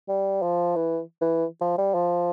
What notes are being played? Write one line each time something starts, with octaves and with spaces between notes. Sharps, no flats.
G3
F3
E3
E3
F3
G3
F3